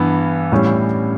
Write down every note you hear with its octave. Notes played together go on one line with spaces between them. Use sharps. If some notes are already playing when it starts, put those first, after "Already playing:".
Already playing: G2 E3 B3
A2 E3 G3 C#4